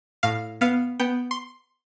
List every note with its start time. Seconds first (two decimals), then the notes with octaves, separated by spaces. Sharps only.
0.23 A2 F5
0.61 B3 F5
1.00 B3 G5
1.31 C6